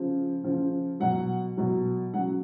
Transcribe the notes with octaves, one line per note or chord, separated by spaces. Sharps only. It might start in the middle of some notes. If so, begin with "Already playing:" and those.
Already playing: C#3 F3
C#3 F3
B2 F#3 F#5
B2 F#3
C#3 F#3 F#5